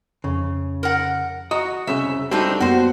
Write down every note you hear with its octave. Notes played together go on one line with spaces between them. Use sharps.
F2 C#3
A#4 F#5
F#4 D#5 A#5
C2 C#3 C#4 E5
G3 A3 C4 D4 D#4 F#4
F#2 A#3 B3 F#4 C5